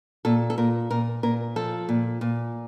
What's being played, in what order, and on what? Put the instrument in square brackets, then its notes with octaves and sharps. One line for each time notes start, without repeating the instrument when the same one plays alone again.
[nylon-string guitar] A#2 A4
A4
A#2 A#4
A#2 A#4
A#2 A#4
F3 A4
A#2
A#2